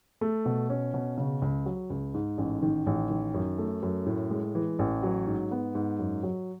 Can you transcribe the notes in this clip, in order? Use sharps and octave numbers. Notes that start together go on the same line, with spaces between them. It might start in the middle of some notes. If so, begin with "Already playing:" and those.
A3
B2
C#4
B2
C#3
C#2
F#3
C#2
G#2
A1
D#3
A1
D#3
F#2
A3
F#2
A2
G#3
E3
A1
F#3
G#2
B3
G#2
F#2
F#3